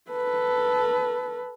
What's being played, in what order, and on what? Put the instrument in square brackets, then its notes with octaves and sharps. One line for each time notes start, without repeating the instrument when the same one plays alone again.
[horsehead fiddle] A4 B4